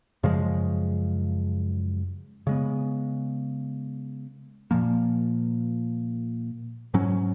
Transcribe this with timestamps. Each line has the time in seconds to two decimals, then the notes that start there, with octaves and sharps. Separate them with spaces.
0.23 F#2 C#3 F3 G#3
2.47 C#3 G#3 B3
4.71 A#2 F3 A#3
6.94 G#2 F#3 C#4